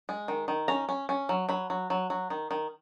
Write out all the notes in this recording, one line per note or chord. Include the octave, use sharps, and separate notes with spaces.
G#3
D#3
D#3
C#4 A#5
C#4
C#4
F#3
F#3 B5
F#3
F#3
F#3
D#3
D#3